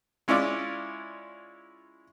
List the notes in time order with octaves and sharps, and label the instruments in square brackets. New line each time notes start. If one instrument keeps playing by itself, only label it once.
[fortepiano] G#3 C#4 E4 F4 D5 E5